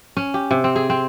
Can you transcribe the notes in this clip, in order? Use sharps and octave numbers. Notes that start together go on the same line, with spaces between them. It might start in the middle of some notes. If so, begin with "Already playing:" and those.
C#4
G4
C3
C4
G#4
C4